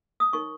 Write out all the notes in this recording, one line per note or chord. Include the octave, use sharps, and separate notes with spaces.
D#6
D#4 A#4 C#5 C#6